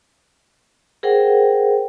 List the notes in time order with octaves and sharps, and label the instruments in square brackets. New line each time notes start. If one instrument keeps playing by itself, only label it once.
[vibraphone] G#4 A#4 C5 F#5 G5